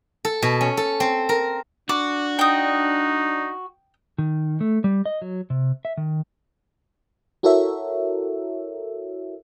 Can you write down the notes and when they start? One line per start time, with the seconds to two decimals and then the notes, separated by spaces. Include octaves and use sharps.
0.25 A4
0.42 B2
0.61 C#4
0.77 A4
1.00 C4
1.29 A#4
1.89 D4 F#4 D6
2.39 D#4 G5 D#6
4.18 D#3
4.61 A3
4.84 G3
5.06 D#5
5.22 F#3
5.50 C3
5.85 E5
5.97 D#3
7.43 E4 F#4 A4 A#4 C#5 E5